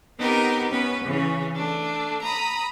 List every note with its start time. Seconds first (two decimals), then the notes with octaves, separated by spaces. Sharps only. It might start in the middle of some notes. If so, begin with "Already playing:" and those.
0.19 B3 C4 D#4 G4 A#4
0.70 B3 C#4 B4
1.05 C#3 E3 C#4
1.56 A3 D4
2.22 A#5 B5 D#6